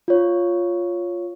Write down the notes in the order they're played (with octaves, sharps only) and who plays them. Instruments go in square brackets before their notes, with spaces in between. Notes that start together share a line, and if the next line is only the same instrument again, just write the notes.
[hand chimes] F4 C#5